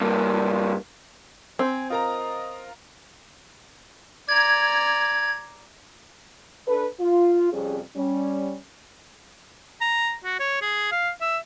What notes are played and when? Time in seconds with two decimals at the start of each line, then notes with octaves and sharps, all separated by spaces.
0.01 G2 A#3
1.59 C4 G#5
1.90 F4 A#4 D#5 A#5
4.29 D5 A#5 G#6
6.67 D4 A4 B4
7.00 F4
7.52 F2 C3 G3 C#4 G#4
7.96 G3 C#4
9.81 A#5
10.25 F#4
10.40 C#5
10.62 G#4
10.92 F5
11.21 E5